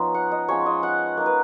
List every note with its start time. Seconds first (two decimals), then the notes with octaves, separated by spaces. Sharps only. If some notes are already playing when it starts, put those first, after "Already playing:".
Already playing: F3 B3 C#4 D#4
0.14 F#5
0.32 D#5
0.48 F3 G#3 C#4 F4 C#5
0.66 D#5
0.83 F#5
1.17 A#3 D#4
1.26 B4